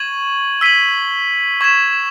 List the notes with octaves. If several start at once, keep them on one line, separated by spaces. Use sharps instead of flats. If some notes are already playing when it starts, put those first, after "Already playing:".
Already playing: C#6 G#6 D#7 F#7
E6 B6 D#7 F#7
C#6 G#6 B6 E7